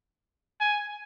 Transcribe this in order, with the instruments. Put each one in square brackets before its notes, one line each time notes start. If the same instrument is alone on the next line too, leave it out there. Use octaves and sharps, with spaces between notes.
[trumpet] G#5